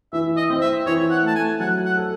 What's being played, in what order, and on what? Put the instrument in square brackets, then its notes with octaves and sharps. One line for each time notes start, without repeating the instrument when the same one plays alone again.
[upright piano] E3 [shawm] E5
[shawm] D#5
[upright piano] C4
[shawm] E5
[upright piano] E3 [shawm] C#5
[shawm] F#5
[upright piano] A3 [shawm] A5
[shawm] G#5
[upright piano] F#3 [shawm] F#5
[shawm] F#5
[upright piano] A4